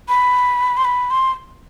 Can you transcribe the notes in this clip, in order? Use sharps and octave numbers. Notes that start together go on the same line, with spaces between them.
B5
C6
B5
C6